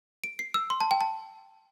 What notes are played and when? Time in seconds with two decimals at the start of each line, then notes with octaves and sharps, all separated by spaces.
0.24 D7
0.39 C7
0.54 E6
0.70 C6
0.81 A5
0.91 G5
1.01 A5